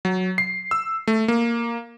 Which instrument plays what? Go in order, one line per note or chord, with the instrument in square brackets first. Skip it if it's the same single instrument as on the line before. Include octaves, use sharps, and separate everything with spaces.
[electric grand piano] F#3
C7
E6
A3
A#3